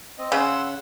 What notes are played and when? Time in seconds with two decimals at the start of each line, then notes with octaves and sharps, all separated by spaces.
0.18 C4 D#5
0.32 C#3 F#5 C6 E6